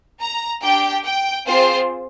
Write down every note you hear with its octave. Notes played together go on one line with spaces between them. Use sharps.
A#5
D4 G4 G5
G5
C4 F4 G#4 C5